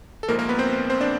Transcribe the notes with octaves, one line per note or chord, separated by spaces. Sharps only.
A4
A#1 G#2 F3 A#3 A#4
A#3 A#4
B3 B4
C4 C5
C4 C5
D4 D5